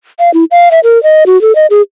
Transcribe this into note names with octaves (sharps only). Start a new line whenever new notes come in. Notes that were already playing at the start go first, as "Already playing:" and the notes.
F5
E4
F5
E5
A#4
D#5
F#4
A4
D#5
G#4